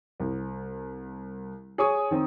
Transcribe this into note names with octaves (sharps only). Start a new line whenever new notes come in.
C2
G#4 C#5 C#6 D#6
D#3 C4